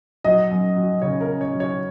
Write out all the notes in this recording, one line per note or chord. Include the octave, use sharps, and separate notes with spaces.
F#3 D#5
F#2
F#3
C#3 C#5
A#4
C#4
C#5
F#3
C#5